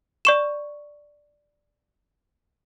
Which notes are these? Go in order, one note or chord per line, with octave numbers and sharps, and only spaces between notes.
D5 C#6 E7